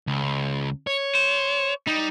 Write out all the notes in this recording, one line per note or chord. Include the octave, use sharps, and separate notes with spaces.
C#2
C#5
C5
G3 D#4